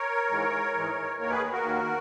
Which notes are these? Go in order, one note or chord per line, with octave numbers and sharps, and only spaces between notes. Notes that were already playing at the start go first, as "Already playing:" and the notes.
Already playing: A#4 C#5
G#2 E3 G#3
G#2 E3 G#3
D#2 D#3 A#3 A#4 C#5
G#4 B4
F#4 A#4
D#2 D#3 A#3